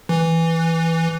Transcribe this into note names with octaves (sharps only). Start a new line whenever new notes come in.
E3